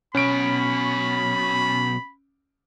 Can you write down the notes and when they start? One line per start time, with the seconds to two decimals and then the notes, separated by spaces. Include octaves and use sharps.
0.15 B1 B2 C#4 B5 D7